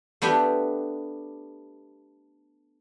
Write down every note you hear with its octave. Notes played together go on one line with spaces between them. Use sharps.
A3 B3 D4 G4